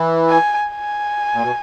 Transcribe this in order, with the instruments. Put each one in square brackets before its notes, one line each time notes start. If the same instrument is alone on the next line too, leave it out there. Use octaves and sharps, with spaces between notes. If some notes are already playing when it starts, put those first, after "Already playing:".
Already playing: [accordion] E3
[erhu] G#5
G#5
[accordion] A#2
B2